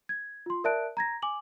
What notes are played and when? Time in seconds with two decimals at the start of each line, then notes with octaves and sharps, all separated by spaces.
0.09 G#6
0.46 F4 C6
0.64 A#4 D5 E5 A5 F#6 D7
0.97 A#5 G#6 A#6
1.22 G#5 D6 F#7